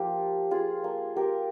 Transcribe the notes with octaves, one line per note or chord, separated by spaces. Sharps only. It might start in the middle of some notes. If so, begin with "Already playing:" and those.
Already playing: F3 A#3 F4 G4
F4 G#4
A#3 F4
G4 A#4